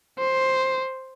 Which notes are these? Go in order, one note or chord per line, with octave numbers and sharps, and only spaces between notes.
C5